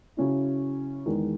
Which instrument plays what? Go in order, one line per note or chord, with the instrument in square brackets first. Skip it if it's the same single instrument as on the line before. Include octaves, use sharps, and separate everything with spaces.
[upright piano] C#3 F#3 C#4 E4
E2 D#3 G#3